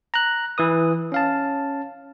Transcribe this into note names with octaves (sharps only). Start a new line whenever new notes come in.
A#5 F#6
E3 B4 D#6
C#4 F5 A5